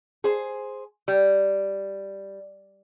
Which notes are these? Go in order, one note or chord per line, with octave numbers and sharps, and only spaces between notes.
G#4 C5
G3